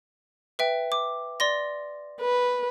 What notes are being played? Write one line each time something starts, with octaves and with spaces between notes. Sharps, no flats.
B4 E5 G5
D6
D5 C6 A#6
B4